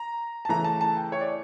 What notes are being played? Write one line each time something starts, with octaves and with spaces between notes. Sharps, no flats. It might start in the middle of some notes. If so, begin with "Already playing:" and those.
Already playing: A#5
A5
C#3 E3 A3 A#5
A5
A5
G5
C#5
D5